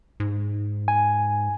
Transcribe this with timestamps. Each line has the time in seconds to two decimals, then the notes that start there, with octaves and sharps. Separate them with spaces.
0.20 G#2
0.88 G#5